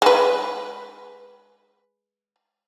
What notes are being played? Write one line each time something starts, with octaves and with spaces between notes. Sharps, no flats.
G#3 B4